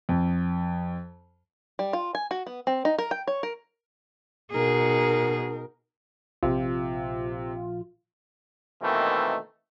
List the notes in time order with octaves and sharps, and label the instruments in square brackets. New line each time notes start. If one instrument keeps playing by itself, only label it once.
[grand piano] F2
[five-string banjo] G3
F4
G#5
F#4
B3
C4
D#4
A#4
G5
C#5
A#4
[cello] B2 G#4 [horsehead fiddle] D#4 A#4
[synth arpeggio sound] A#1 F4 [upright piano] C3
[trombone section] B2 D#3 E3 A3 A#3 C4